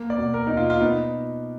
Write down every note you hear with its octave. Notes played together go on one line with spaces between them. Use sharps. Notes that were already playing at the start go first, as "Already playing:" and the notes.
Already playing: A#3
D5
B2
A#4
B2 D#4
F4
F4
B3 D#4